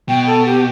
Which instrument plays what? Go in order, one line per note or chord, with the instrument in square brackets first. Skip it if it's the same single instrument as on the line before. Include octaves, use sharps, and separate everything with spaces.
[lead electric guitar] B2 [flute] G5
[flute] A4
G4